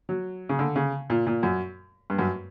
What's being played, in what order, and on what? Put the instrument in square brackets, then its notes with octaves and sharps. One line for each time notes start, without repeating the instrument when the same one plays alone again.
[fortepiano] F#3
C#3
D3
C#3
A#2
A#2
F#2
G2
F#2